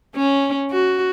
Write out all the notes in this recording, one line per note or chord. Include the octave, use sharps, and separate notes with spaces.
C#4
F#4